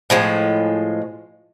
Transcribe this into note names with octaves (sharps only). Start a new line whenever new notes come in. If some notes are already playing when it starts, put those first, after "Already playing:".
A2 F3 G#3